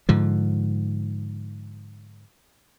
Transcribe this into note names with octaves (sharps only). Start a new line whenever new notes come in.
G#2 D3 F3